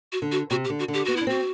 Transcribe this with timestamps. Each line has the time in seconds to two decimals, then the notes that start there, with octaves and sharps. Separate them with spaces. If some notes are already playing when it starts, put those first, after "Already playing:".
0.12 F#4
0.22 D3
0.32 F#4
0.50 C3 F#4
0.64 G4
0.70 D3
0.79 F#4
0.88 D3
0.93 G4
1.05 B3 F#4
1.16 D4 E4
1.27 C4 F#4